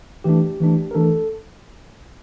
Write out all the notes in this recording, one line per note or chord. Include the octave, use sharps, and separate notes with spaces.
E3 A3 D4 G4
E3 A3 D4
A#4
E3 A3 D4 A4